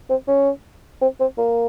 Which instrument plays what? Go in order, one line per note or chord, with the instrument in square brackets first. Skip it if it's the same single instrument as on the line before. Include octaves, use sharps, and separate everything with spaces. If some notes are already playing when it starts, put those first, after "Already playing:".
[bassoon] C4
C#4
C4
C4
A#3